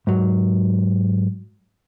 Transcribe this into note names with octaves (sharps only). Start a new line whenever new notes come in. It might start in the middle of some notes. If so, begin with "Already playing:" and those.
G#2 F#3